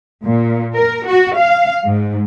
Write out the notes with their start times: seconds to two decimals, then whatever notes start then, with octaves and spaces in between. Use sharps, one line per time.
0.24 A#2
0.75 A#4
1.07 F#4
1.38 F5
1.86 G#2